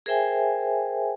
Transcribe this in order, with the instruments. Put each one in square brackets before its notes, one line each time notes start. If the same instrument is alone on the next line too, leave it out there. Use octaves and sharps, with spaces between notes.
[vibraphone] G#4 A#4 C5 E5 G5 G#5